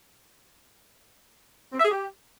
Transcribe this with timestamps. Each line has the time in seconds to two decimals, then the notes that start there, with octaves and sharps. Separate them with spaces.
1.72 C4
1.79 E5
1.85 G#4
1.91 G4